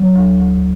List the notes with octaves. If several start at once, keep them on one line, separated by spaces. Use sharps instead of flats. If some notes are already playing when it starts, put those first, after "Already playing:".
Already playing: F#3
D2
D2